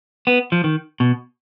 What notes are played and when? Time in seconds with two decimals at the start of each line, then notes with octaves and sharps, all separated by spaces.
0.27 B3
0.52 F3
0.64 D#3
1.00 B2